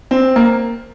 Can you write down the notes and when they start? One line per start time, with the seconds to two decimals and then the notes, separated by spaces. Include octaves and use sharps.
0.11 C4
0.36 A#3